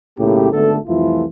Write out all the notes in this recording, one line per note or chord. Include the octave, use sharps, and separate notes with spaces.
B1 A2 C#3 A#3 G4
G#1 D3 A3 B3 A4
C2 F2 E3 A3 E4 F4